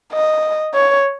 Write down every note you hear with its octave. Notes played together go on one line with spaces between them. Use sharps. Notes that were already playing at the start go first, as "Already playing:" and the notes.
D#5
C#5